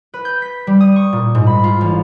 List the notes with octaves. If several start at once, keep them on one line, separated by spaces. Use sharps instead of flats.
B4
G6
B6
G3
D#6
C#6
A#2
G#2
B5
F4
A1